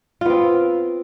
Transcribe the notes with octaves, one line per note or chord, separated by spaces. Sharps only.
B3 C4 F4